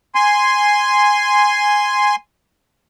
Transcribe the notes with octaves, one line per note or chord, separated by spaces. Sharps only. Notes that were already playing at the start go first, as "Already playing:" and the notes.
G#5 C6